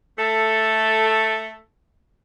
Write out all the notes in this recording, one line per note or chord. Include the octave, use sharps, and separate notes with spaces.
A3 A4